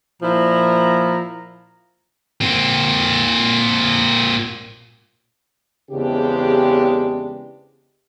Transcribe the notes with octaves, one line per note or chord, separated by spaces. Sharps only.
A#2 F3 E4 A#5
A#2 C4
E2 C#3 G#3 C4 D4 G4